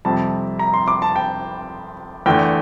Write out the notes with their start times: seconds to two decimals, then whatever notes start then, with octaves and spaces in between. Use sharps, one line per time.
0.05 F2 C3 G3 C4 A5
0.59 A#5
0.74 C6
0.88 D6
1.02 A5
1.16 G5
2.26 E2 D3 A3 G5